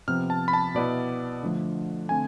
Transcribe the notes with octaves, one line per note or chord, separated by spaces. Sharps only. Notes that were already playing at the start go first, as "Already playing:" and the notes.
C3 F3 B3 F6
A5
B5
A5
B2 B3 E4 D5
D3 F3 A3 D4
D3 A3 C4 G#5